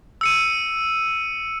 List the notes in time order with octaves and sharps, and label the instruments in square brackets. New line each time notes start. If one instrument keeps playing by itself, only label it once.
[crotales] E6 C#7 D#7